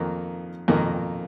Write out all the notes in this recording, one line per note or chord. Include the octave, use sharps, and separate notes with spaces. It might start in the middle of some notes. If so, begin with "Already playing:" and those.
Already playing: F2 D#3 A#3
F2 D#3 A#3